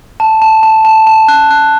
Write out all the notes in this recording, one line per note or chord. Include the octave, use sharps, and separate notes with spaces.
A5
A5
A5
A5
A5
F#6
F#6